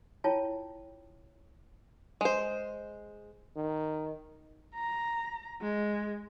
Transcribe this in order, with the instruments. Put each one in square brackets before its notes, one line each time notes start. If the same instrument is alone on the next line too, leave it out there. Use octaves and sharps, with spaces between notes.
[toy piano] E4 F4 C#5 G5 A5
[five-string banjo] G#3 C5
[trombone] D#3
[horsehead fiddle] A#5
G#3